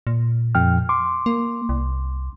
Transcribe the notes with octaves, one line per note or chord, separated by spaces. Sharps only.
A#2
F2 G5 F6
C6 D6
A#3
C2